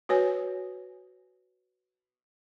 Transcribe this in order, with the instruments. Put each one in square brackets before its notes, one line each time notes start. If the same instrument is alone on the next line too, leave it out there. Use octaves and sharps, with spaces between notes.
[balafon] F#4 B4 C#5 G#5